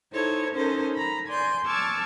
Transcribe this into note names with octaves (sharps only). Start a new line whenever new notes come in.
D#4 E4 A4 C5 C#5
C#4 D#4 A4 A#4 C5
A#5 B5
D5 G#5 C6 G6
A5 C#6 D6 E6 F6 G#6